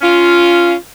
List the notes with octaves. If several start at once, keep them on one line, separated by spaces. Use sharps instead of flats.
C#4 F4